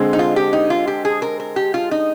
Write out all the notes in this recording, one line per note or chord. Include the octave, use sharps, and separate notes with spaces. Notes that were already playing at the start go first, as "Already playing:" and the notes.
Already playing: D3 G#3 C4
D#4
F4
G4
D#4
F4
G4
G#4
A#4
A#4
G4
F4
D#4